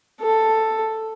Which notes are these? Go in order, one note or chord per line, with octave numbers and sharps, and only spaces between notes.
A4